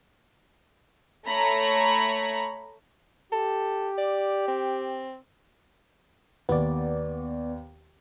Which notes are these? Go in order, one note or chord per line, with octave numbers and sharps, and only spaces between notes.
A3 C#5 A#5 B5
G4 A4
D5
C4
D#2 B3 D5